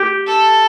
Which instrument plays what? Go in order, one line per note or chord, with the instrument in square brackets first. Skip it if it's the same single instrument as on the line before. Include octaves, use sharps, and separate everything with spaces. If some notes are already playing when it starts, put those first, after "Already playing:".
Already playing: [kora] G4
[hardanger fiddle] A4